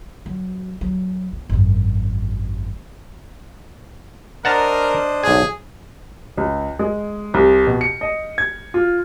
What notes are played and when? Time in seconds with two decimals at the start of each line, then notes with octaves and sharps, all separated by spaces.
0.26 F#3
0.81 F#3
1.33 B3
1.49 G#1 F#2
4.45 D4 A#4 C5 D#5 F#5 A5 A#5
5.24 B1 G#4 G#5
6.37 C#2
6.79 G#3
7.34 C2
7.67 B2
7.81 C#7
8.01 D#5
8.38 G#6
8.74 F4